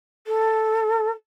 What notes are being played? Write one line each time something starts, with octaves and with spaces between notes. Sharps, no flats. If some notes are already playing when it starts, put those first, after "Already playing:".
A4